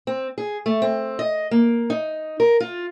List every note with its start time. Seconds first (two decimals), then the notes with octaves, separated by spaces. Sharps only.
0.07 C4
0.38 G#4
0.66 A3
0.82 C4
1.19 D#5
1.51 A#3
1.90 D#4
2.40 A#4
2.60 F4